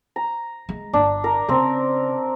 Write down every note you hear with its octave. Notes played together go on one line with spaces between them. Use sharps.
A#5
G#3
G1 D4
A#4
C#3 C4 A#4